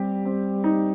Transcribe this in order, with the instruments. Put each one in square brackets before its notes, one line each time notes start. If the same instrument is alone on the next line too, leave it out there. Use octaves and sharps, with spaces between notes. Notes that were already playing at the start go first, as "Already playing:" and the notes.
Already playing: [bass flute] G3 [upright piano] C4 G4
[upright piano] C4
D#4